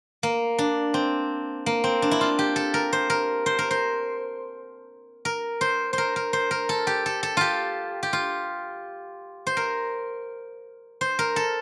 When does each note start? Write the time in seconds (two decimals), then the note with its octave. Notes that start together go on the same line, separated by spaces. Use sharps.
0.23 A#3
0.58 D4
0.94 C4
1.66 A#3
1.84 C4
2.02 D4
2.11 E4
2.21 F4
2.39 G4
2.56 A4
2.74 A#4
2.93 C5
3.10 A#4
3.46 C5
3.59 A#4
3.71 C5
5.25 A#4
5.61 C5
5.93 C5
5.98 A#4
6.16 A#4
6.33 C5
6.51 A#4
6.69 A4
6.87 G4
7.06 A4
7.23 A4
7.37 F4 G4
8.03 G4
8.13 F4
9.47 C5
9.57 A#4
11.01 C5
11.19 A#4
11.36 A4